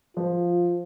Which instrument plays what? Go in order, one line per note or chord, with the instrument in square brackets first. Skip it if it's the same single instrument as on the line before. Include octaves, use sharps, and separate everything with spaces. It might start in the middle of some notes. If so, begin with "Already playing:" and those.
[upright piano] F3 [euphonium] F4